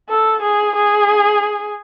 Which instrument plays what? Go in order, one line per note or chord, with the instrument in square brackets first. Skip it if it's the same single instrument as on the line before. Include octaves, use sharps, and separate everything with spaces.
[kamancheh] A4
G#4
G#4